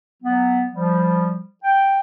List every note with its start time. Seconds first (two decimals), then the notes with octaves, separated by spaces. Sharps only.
0.23 F#3 B3
0.73 F3 G3
1.64 G5